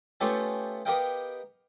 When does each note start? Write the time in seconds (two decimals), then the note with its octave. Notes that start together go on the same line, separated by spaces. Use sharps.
0.21 A3 B3 C#4 F4 G4 A4
0.85 B3 G4 A#4 D#5 F5 G5